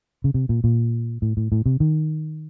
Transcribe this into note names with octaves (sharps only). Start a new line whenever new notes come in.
C#3
C3
A#2
A#2
A2
A2
A2
C3
D#3